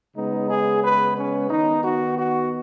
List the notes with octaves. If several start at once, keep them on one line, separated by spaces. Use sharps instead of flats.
C#3 G#3 B3 D#4
G#4
B4
C#4
D#3 B3 D#4
F#4
F#4